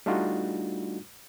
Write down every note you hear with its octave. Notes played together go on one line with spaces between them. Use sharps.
G3 A3 D4 D#4 F4 F#4